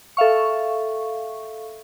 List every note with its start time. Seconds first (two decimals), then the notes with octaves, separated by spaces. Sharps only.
0.17 A4 E5 F5 C#6